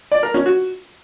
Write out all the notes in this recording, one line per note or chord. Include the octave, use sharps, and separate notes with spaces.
D5
A#4
C#4
F#4